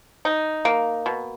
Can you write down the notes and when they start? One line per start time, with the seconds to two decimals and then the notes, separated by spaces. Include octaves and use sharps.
0.25 D#4
0.65 A#3
1.06 B2